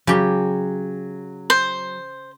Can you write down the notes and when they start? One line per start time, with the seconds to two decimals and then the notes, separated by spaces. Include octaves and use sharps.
0.07 C#3 F#3 G4
1.50 C5